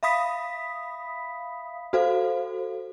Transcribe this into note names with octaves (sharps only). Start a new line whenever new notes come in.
E5 F5 B5 D#6 B6
F#4 A4 C5 F5